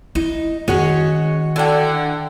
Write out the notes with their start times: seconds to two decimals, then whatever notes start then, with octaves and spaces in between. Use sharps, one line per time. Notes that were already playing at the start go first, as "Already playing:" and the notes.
0.15 D#4 E4
0.68 D#3 G#3 C#4 F#4 C#5
1.56 D3 E4 G5